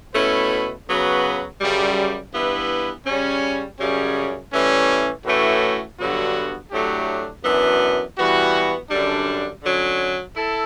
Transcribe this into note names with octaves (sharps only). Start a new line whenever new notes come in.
B2 A3 C#4 E4 B4
C#3 F#3 B3 F#4 B4
F#2 C#3 G3
G2 E3 B3 E4 B4
C#3 G3 C#4
F#2 C#3 G3 C#4
A2 E3 G3 C#4
A2 E3 A3 C#4 F#4
G2 D3 F#3 B3 F#4
A2 F#3 A3 D4 G4
F#2 E3 B3 D4 F#4
E3 G3 B3 F#4
F#2 D3 G3 D4
D3 F#3 C#4
E4 A4